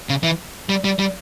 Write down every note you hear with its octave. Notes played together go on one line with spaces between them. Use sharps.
C#3
E3
G3
G3
G3